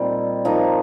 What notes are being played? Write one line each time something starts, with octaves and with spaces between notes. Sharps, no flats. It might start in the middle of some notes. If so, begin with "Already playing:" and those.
Already playing: A#2 G3 C4 D#4
F3 A#3 D#4